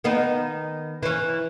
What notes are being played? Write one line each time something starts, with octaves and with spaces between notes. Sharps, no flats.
D#3 B3 D#4
E3 C#4